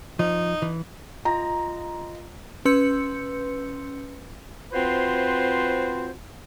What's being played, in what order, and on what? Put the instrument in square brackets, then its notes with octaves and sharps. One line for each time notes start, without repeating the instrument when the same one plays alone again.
[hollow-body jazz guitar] F3 [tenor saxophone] D#4
[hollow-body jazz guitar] E3
[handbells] F4 D#5 [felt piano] A#5
[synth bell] C#4 B4 C6 E6 G6 C#7
[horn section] C4 F4 F#4 B4 C5